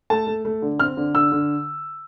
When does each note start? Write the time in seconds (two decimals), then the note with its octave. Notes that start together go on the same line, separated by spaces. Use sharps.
0.10 A3 A5
0.27 A3
0.45 A3
0.62 D3
0.80 C4 F6
0.97 D3
1.14 D3 E6
1.32 D3